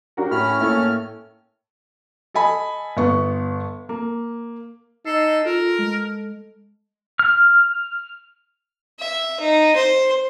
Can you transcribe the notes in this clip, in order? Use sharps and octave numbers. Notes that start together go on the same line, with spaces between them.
D4 F#4 G4 A#4
A2 C#4 B5 F6
A#3 E4 A4 C#5
A4 D#5 G#5 B5
G1 B3 C#6
A#3
D#4 A4 C7
F4 A4 A#4
G#3
F6
E5
D#4
C5